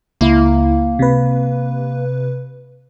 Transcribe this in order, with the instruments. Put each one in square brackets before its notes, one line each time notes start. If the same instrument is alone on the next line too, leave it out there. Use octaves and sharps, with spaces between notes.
[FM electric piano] C#2 E4 [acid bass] A#3
[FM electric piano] C3 B4